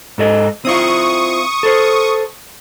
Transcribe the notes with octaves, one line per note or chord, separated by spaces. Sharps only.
G#2 A4 D#5
C4 E4 F4 C#6 D#6
A4 C5